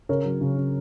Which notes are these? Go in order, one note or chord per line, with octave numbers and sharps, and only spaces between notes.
C#3 A#4 C#5
F#3
C#3
C#3